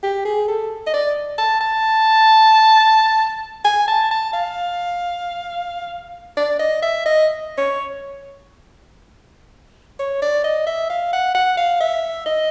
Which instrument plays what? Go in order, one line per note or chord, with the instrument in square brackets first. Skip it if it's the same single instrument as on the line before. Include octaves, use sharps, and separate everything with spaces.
[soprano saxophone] G4
G#4
A4
D#5
D5
A5
A5
G#5
A5
A5
F5
D5
D#5
E5
D#5
C#5
C#5
D5
D#5
E5
F5
F#5
F#5
F5
E5
D#5